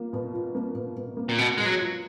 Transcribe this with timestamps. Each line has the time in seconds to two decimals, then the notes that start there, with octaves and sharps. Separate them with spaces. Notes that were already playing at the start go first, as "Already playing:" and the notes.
Already playing: A#3 F4
0.13 B2
0.34 F4
0.55 A#3
0.75 B2
0.96 B2
1.17 A#3
1.29 A#2
1.38 B2 A#3
1.58 B2 G#3
1.66 F#3
1.80 F4